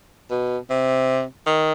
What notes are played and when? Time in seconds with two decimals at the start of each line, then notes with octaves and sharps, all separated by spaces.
0.31 B2
0.70 C3
1.46 D#3